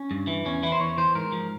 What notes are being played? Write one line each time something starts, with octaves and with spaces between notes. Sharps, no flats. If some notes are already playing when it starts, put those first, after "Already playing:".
Already playing: C#4
G2
E3
E2 C#4
E3 E4
C5
E2 C#5
E3 C5
G#2 A#4
F3